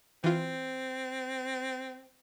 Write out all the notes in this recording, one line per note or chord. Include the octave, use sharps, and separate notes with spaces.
E3 C4 F4